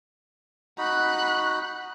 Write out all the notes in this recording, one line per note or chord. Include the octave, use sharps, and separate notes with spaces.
D#4 F#4 B5 F#6